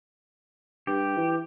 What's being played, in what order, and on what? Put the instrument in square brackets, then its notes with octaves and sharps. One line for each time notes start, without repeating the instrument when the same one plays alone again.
[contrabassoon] G2 [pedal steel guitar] G4
[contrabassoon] E3